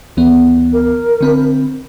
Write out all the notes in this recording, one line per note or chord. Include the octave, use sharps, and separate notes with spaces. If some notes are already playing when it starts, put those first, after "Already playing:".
D2 E3 B3
A#4
D3 C4 B5